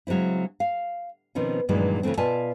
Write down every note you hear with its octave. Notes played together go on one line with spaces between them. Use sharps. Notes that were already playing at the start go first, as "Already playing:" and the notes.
C#3 F#3 G#3 C4 E4
F5
B2 D#3 F3 C4 C#4
G2 A#2 D#3 E3 F#3 G#3
C#3 E3 F3 A3 C4
B2 F4 D5 E5 G#5 A5